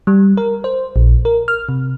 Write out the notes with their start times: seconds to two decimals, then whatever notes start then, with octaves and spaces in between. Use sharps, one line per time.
0.07 G3
0.37 A#4
0.64 C5
0.96 A#1
1.25 A#4
1.48 F6
1.69 C3